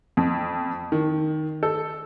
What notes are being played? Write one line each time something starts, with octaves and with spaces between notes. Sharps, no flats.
F2
D#3
A4